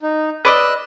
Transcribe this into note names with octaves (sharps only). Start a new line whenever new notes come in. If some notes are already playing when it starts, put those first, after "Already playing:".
D#4
B4 D5 D#5 E6 F#6